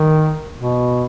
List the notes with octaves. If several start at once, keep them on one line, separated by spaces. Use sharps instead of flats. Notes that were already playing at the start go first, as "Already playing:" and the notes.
Already playing: D#3
B2